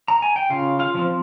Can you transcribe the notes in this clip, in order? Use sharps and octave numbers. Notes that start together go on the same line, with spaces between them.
A#5
G#5
G5
C#3 F4 F5
F4 F5
F3 C4